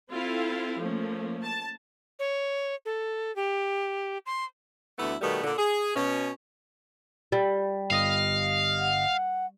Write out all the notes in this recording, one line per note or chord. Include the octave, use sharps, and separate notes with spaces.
C4 E4 F4 A4 F5
F3 A3 A#3 C#4
A5
C#5
A4
G4
C6
D2 E3 A3 B3 E4
B2 D#3 G3 A3 B3
A#2 D3
G#4
B2 C#4
G3
G1 D#5 F5 D#6
F#5